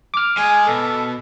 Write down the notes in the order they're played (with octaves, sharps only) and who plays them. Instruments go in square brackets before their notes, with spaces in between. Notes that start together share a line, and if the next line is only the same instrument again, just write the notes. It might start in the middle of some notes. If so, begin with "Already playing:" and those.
[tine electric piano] D6 F6
[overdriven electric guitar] G#3 D#5 [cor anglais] G#5
[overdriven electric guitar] B2 [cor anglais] A4